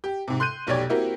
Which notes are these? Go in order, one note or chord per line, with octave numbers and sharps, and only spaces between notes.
G4
G#2 C3
C6 F#6 G6 D#7
F1 B1 G4 C#5 D5 G#6
A#3 C4 E4 F#4 G4 A#4